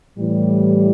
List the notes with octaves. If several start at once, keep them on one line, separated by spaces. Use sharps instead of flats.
A2 E3 G3